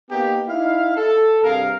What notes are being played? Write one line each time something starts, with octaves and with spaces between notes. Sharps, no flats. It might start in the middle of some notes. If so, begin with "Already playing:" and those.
A#3 B3 D#4 G4
D#4 E4 F5
A4
G2 C3 G#4 A#4 F5